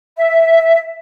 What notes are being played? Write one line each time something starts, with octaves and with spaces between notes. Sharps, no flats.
E5